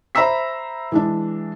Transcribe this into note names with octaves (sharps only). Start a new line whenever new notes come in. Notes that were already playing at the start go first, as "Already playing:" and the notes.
C5 E5 A#5 B5 E6 B6
E3 G#3 D4